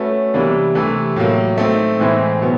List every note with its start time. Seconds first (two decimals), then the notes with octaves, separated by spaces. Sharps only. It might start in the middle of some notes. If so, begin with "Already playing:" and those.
Already playing: A3 C#4 F#4 B4
0.34 C3 E3 G3 A#3 D4
0.75 C3 E3 A3
1.16 A2 F#3 A#3
1.58 A3 C4 D#4
1.99 A2 E3 G#3 C4 E4
2.41 B2 F#3 B3